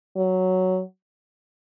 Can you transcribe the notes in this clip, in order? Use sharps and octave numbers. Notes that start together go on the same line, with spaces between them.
F#3